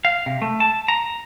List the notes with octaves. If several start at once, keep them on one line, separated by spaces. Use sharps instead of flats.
F5
C3
A3
A5
A#5